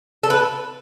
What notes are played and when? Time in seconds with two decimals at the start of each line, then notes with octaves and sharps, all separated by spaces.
0.23 A4
0.30 B4